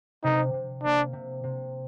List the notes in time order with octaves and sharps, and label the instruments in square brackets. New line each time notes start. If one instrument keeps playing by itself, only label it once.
[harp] C3 [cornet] D#4
[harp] C3
[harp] A#3 [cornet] D4
[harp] C3
C3